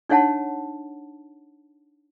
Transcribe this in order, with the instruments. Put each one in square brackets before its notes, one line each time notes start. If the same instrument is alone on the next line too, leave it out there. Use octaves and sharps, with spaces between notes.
[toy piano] D4 D#4 C#5 F#5 A5